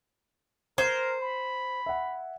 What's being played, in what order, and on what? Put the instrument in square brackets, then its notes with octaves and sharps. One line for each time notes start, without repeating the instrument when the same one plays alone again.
[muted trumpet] A#4 [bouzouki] C5 [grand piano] G#6
[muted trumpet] B5
[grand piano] E5 F#5